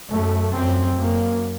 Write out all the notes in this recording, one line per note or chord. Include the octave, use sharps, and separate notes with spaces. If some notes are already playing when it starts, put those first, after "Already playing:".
F#2 A3
F#2 C4
F#2 A#3